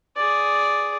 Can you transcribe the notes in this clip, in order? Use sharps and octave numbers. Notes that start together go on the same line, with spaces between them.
G#4 D5